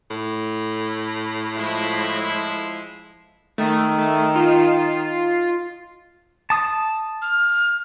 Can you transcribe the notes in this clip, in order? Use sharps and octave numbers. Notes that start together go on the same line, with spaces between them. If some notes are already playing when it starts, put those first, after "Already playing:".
A2
F3 G#3 E4
D#3 A3
A3
F4
A5 D#6
F6